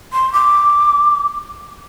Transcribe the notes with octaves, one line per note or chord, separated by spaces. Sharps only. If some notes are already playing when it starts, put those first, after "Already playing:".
C6
D6